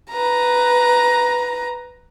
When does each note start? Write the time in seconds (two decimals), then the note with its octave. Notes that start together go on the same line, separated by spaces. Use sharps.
0.10 B4 A#5